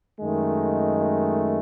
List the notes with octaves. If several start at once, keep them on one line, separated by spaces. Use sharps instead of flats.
F#2 D#3 G#3 A3
A3